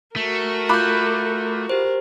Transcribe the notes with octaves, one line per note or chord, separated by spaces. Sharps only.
A3 F#4 A#4
F4 B5 D6 F#6 G6
G4 A#4 C5